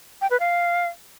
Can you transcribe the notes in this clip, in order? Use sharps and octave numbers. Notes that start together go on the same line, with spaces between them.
G5
B4
F5